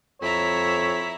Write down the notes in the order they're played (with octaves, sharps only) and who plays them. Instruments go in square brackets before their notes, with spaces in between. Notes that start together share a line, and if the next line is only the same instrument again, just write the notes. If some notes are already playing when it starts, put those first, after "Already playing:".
[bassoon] F2 [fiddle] E4 A#5 [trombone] C#5 [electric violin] E6 B6